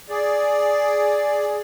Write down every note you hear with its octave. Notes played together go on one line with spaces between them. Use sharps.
G#4 D5